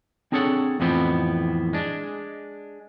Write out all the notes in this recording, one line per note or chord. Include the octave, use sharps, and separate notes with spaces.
C4 D4 G#4 A4 C#5 F#5
F2 A2 E3 F3 B3 C4
G#3 D4